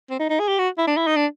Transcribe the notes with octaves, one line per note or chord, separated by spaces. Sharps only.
C4
D#4
D#4
G#4
G4
F#4
E4
D4
E4
D#4
D4